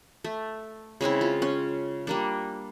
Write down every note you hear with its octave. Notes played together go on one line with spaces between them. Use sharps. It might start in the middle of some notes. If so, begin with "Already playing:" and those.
A3
C#3 G#3 C4 E4
F4
C#4
G3 A#3 D4